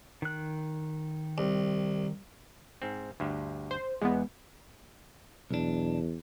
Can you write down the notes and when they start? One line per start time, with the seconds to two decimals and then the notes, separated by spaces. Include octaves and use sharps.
0.22 D#3 F#6
1.38 C2
2.82 G#2 C4
3.20 D2 G2
3.71 C5
4.02 E2 G#3 B3
5.51 B1 E2 D4